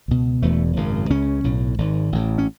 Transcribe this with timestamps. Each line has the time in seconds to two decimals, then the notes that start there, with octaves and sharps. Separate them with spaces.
0.08 C#2 B2
0.42 E1 E2 B2 A3
0.76 G#1 F#2 C#3
1.10 C#2 C#3 C#4
1.44 B1 A2
1.78 G#1 G#2
2.12 A1 A2
2.38 C#4